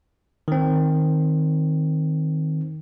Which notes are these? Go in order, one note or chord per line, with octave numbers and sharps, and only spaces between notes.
D#3 C4